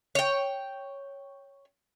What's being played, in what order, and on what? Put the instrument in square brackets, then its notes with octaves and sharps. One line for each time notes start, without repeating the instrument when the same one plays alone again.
[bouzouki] C#5 G5